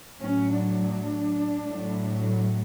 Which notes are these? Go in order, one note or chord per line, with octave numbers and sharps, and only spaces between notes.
A2 F#3 C#4
D4
A2 F#3